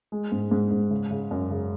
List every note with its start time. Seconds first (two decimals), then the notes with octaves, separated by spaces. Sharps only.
0.12 G#3
0.32 G#2
0.51 G#2
0.71 G#2
0.91 C#3
1.11 C#3
1.31 F#2
1.51 C#3